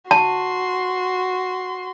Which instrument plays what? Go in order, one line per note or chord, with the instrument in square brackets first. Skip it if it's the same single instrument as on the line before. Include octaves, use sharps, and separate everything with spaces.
[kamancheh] F#4 C6 [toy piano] A5